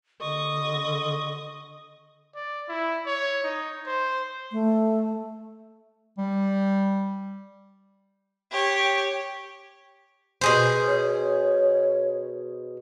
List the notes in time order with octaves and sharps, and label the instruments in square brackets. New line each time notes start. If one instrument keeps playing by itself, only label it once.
[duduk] D3 [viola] D#5 [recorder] C#6
[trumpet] D5
E4
C#5
D#4
C5
[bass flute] A3
[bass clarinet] G3
[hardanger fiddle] G4 C#5
[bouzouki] B2 G#4 C5
[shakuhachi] C#5